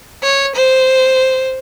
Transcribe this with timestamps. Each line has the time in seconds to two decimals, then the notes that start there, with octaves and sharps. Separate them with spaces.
0.23 C#5
0.55 C5